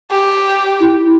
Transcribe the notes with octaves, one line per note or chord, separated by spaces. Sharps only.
G4
E4